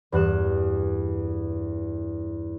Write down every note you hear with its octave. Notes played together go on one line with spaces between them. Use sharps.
E2 G2 F#6 E7